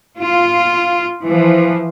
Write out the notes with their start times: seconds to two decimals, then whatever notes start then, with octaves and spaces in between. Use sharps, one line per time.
0.18 F4
1.25 E3 F3